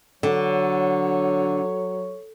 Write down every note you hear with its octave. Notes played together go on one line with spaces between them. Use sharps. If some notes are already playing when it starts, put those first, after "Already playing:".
D3 F#3 C#5